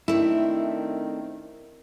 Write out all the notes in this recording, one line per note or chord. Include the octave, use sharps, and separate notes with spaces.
D#3 A3 C4 D4 E4